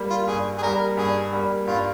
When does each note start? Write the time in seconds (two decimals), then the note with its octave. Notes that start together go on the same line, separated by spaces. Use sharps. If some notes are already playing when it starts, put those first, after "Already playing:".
Already playing: G3 A#3
0.10 F4
0.28 G2 G#4
0.58 G#4
0.62 G3 A#3 A#4
0.97 G2 G#4
1.33 G3 A#3
1.67 G2 F4